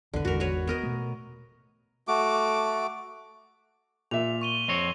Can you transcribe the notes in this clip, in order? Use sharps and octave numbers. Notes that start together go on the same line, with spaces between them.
B1 E2 D3 B4
G#1 E2 G#2 F#4 A#4
F#4 B4 C#5
B3 A#4 D#5
B2 A3
A3 F#4 D6
A#2 E5 F7
C#6 D#7 G7
F2 C4 C#5